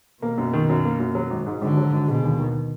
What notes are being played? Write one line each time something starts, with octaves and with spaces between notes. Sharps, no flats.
B2 A#3
F#2
D#3
F#2
A#3
F#2
F#3
G#1
G#2
G#1 D3
F#3
G#1
B2 G#3
D#2
D#3